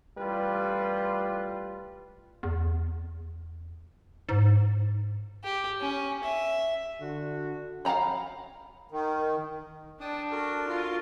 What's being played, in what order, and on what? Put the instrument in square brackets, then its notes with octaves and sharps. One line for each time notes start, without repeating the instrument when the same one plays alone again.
[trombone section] A1 G3 F4 B4
[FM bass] E2
G#2
[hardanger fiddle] G4
C#4
E5
[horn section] D3 F#4
[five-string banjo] F5 F#5 G#5 A#5 B5
[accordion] D#3
[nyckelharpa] D4 [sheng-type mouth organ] G5 A5 D#6
[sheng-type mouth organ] F#4 A4 A#4
[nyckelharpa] F4